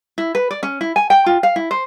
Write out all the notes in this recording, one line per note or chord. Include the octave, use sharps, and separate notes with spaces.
E4
B4
D5
C#4
E4
G#5
G5
F4
F5
E4
C5